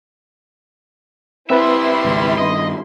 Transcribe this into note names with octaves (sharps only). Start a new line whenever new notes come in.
G3 C4 E4 B4 E5 B5 C6
G#1 C#2
G2 D#3 D#5